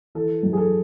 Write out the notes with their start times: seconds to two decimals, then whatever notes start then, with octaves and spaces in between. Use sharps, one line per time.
0.15 E3 A4
0.43 F#2
0.53 G#4
0.57 A4